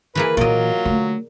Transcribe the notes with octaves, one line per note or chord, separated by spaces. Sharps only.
E3 A#3 G#4 B4
A#2 E3 F#3 F4 D5 D#5
D3 A3